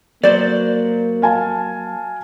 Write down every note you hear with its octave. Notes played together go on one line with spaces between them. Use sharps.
F#3 A#3 C5 D5
F5 G#5 A5